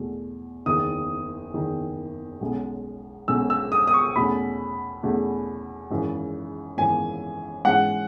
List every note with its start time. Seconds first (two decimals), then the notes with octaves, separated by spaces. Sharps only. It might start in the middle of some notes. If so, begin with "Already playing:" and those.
Already playing: E2 B2 A3
0.66 F#1 E2 D#3 D#6
1.53 F#1 E2 D#3
2.41 B1 B2 G#3 C#4
3.28 B1 B2 G#3 C#4 E6
3.50 E6
3.72 D#6
3.87 D#6
3.94 C#6
4.15 E2 B2 A3 C#4 B5
5.03 E2 B2 A3 C#4
5.90 G#1 F#2 C#3 E3
6.77 G#1 F#2 C#3 E3 G#5
7.65 G#2 E3 G#3 C#4 F#5